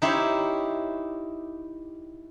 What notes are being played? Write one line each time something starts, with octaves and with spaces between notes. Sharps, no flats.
D#4 E4 G4 C5 C#5